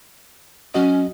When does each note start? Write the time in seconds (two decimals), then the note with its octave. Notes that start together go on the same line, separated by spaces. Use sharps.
0.74 F#3 C#4 F#4 D#5